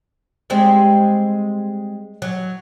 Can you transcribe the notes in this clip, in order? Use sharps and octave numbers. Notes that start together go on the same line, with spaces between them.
G3 G#3 C4
F#3